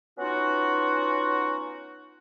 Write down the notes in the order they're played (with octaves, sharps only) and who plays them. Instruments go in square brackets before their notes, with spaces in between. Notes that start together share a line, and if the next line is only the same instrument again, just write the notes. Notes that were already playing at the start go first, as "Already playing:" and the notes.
[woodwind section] B3 C#4 D#4 F4 F#4